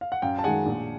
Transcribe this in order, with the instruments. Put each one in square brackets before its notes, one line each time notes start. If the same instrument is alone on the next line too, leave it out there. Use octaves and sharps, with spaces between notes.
[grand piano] F5
F#5
[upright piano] F#2 [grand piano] F5 G5
[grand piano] A5
[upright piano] D#3 G#3 [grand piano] F#5 G#5
[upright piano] A#1